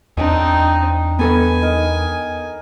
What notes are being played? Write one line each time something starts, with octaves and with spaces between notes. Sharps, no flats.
E2 C4 D4 D#4 D#5 G5 A5
B3 A4 B4 G#5
D#4 A#4